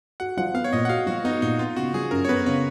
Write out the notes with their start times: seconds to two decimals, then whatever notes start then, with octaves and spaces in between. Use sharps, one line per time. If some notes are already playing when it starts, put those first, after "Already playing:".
0.20 F#4 F#5
0.37 F3 F#5
0.54 B3 F5
0.64 C#5
0.73 A#2 D#5
0.85 F#5
0.89 F#4 F5
1.06 F3 F#4
1.24 B3 D#4
1.42 A#2 D#4
1.59 B3 F4
1.76 C#3 F#4
1.94 F3 G#4
2.11 F#2 A#4
2.25 C#5
2.29 B3 B4
2.46 C#3 C#5